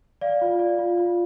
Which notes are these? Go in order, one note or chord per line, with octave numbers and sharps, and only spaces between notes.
D5 F5
F4
D5
F4
F4